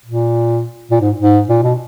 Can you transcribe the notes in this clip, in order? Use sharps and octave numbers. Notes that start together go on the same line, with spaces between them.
A#2
A#2
G#2
G#2
A#2
B2